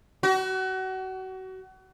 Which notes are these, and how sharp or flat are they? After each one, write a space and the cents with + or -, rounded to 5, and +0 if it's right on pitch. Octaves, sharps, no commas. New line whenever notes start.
F#4 +30